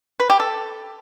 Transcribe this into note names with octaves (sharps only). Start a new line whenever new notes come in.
B4
G4
A4